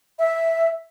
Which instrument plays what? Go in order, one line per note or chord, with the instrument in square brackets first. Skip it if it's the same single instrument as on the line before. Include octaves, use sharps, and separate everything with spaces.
[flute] E5